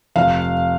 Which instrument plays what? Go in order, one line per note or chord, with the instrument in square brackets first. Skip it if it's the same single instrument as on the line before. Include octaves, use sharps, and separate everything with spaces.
[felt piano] F1 F5